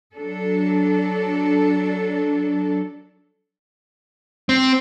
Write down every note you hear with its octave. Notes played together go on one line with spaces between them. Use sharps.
F#3 D4 A4
C4